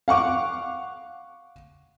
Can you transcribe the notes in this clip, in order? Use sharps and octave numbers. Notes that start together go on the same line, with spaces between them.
F5 F#5 C#6 D6